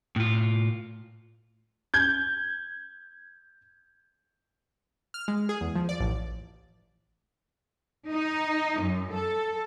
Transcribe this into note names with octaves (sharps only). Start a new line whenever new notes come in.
A2 F4
G6 G#6
F6
G#3
G#4
E2
F3
D5
A1
D#4
F#2
A4